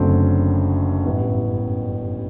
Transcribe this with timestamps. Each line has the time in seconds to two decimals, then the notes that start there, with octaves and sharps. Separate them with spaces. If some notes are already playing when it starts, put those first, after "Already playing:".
Already playing: F#1 F#2 D3 A3 C4
1.05 A1 G2 E3 B3 E4